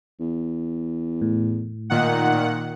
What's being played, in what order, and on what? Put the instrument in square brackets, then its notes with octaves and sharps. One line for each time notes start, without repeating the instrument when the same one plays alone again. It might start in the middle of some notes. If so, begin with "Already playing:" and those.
[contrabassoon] E2
[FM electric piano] A2
[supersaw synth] A#2 D#3 F#5